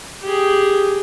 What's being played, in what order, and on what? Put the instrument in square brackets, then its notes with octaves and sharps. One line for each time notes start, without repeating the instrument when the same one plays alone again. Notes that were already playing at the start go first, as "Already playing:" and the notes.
[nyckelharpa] G4 G#4